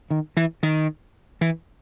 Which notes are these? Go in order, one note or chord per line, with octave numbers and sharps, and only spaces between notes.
D#3
E3
D#3
E3